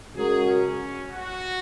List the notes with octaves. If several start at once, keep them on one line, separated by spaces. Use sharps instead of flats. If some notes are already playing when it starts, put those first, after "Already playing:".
C#3 G#3 F#4 G#4 A#4
C#4
F#4